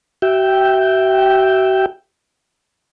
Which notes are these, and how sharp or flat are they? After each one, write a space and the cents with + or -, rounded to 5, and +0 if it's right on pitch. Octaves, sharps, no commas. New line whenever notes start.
F#4 +45 E5 +0 G5 +0